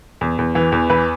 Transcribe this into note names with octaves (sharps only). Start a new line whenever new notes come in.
E2
E2
E3
E2
E3 B4